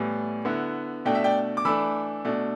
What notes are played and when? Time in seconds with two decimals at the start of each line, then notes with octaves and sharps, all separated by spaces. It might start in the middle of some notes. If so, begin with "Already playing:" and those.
Already playing: A2 E3 G3 B3
0.45 D3 B3 E4
1.05 B2 A3 D4 G5
1.15 E5
1.24 D5 G5
1.57 D6
1.65 E3 A3 D4 B5 E6
2.25 B2 A3 D4